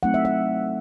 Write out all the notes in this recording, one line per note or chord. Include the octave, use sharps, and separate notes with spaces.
F#3 A3 C4 D#4 F#5
E5
F#5